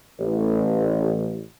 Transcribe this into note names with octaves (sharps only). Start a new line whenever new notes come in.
A1